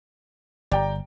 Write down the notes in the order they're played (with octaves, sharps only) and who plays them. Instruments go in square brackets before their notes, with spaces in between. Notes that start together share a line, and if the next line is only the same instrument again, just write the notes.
[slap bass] G1 [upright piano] D5 G5 A#5